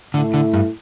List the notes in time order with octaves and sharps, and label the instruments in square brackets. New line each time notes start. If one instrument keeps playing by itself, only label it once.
[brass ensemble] A2 A3 E4 [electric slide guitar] D3
[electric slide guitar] D3
G2